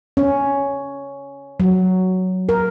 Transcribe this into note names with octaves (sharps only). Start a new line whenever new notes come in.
C#4
F#3
A#4